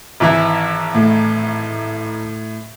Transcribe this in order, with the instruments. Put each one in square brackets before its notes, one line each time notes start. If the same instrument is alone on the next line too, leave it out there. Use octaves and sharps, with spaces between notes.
[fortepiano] G#1 E3 E4
[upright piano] A2